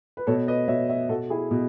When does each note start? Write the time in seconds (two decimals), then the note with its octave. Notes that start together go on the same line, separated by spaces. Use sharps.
0.17 B4
0.27 B2 A4 C#5
0.47 B4 D#5
0.68 B2 C#5 E5
0.89 C#5 E5
1.09 B2 F#4 A4
1.30 E4 G#4
1.51 B2